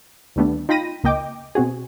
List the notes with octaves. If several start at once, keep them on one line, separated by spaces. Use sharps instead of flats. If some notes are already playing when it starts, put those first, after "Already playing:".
D2 D#3 G3 A3 B3 D4
D#4 F4 G5 B5 A#6 D#7
C#2 A#3 D#5 G5 D6
B2 C4 F#4 G#4